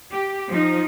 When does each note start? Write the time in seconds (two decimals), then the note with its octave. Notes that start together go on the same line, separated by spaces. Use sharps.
0.12 G4
0.49 F3 D#4